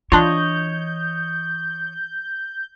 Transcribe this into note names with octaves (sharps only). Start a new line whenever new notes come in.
E3 D4 F4 C#5 D#5 G6